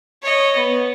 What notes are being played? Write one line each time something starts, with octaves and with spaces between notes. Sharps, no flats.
C#5 D#5
B3